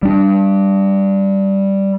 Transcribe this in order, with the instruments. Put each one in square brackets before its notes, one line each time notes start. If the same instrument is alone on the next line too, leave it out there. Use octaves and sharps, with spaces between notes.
[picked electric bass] G3 D4